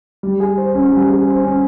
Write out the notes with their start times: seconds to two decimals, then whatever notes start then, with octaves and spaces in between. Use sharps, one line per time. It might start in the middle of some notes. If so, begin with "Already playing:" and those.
0.23 G3
0.40 G#4
0.58 C5
0.75 C#4
0.92 G3
1.10 G#4
1.28 C5
1.44 C#4